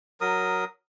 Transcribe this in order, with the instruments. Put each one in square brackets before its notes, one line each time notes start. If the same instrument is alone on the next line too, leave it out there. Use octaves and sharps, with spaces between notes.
[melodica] F#3 A#4 D#6